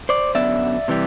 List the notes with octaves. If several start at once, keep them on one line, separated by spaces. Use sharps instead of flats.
C5 D5
F#2 D3 F#3 B3 D5 E5
C3 E3 G3